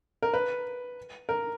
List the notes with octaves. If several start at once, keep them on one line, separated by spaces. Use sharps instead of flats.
A#4
B4
A#4